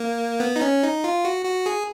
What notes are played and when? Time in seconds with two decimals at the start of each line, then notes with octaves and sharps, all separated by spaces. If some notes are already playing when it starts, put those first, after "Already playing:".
Already playing: A#3
0.40 B3
0.56 D#4
0.61 C#4
0.82 D#4
1.04 F4
1.25 F#4
1.45 F#4
1.66 G#4